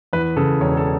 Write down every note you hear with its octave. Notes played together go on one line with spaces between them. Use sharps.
E2 B4
C#3 A4
E1 C#5
A4